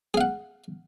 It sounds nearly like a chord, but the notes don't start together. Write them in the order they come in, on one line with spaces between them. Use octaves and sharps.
G#4 F5 F#5